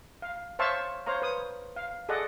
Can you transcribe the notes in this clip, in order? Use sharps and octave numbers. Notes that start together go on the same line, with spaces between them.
F5
C5 C#5 E5 F5 A5 C#6
C5 C#5 F5 A#5
B4 D#6
F5
G#4 A4 D5 D#5 F#5